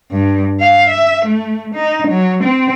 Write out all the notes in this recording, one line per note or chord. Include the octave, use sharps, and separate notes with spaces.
G2
F5
E5
A3
D#4
F#3
C4